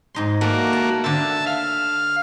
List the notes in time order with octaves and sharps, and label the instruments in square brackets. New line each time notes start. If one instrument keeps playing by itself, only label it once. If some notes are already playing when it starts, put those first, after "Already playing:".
[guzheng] G#2 D#4 C6
[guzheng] A3 D5 [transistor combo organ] A#3 F#4
[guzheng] A5
[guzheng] D3 C5 [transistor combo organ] E5 A5
[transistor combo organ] F5